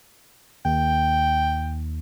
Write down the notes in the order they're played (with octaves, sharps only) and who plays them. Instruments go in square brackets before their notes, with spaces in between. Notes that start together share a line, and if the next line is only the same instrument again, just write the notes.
[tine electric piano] D#2 [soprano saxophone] G5